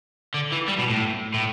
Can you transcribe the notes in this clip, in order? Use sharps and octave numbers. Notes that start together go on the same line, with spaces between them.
D3
E3
G3
B2
A2
A2